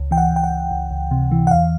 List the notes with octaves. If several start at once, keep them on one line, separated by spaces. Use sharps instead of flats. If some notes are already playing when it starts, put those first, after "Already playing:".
Already playing: C#2
E3 G5
F#5
C#2
G5
F#5
C#2
C#2
C#2
C3
E3
F#5
E2 F5